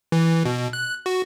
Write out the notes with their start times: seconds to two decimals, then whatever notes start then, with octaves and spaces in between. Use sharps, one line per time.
0.12 E3
0.45 B2
0.73 F#6
1.06 F#4